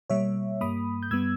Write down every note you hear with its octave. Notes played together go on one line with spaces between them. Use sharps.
B2 G3 A#3 C#5 E5
G2 G3 A#3 B5 D#6
G6
G2 G3 B3 E6 G#6